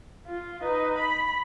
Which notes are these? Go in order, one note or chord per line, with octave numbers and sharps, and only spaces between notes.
F4
D#4 B4
B5